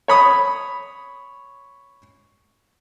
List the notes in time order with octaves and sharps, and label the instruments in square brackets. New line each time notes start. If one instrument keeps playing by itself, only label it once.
[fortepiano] C#5 B5 D#6